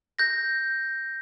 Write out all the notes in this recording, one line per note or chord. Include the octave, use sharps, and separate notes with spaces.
G6 A#6